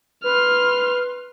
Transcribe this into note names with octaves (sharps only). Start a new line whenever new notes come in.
B4 C6 F6